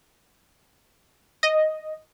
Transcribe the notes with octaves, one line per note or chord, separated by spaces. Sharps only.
D#5